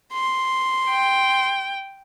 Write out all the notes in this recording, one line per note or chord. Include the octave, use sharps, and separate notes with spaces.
C6
G5